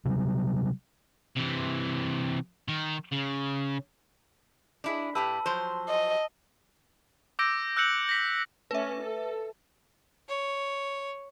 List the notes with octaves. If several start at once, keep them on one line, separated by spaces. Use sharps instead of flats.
C3 F#3 G3
C3 E3
D#3 A#4
C#3
D4 E4 G#4
A2 G4 B4 A5 E6
F3 F#3 C5
D#5
D6 E6 G6 A#6 D7
E6 F#6 G6 C#7 F#7
A#6 B6
A3 C#4 B4 E5
A4
C#5